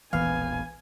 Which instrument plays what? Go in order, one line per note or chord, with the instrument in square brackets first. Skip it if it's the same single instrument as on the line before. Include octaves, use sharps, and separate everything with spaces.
[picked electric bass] E1 A#1 B3 [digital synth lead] E3 [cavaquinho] F5 [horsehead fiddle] G#5